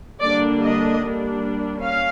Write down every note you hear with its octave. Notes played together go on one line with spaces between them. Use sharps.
D3 G3 A#3 D4 D5
D#5
G3 A#3 D4
C#4 F5